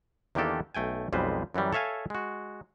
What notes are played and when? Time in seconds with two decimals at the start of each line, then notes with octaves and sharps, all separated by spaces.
0.35 E2 D#3 A#3 D4 G4 A4
0.75 B1 A3 G5 G#5
1.13 B1 F2 G3 G#3 B4 C5
1.54 F#2 E3 F#3 G3
1.73 A4 C#5 E5 F5 G#5
2.10 G#3 F#4